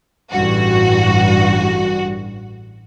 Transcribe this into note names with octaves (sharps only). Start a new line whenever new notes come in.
A1 G2 F#4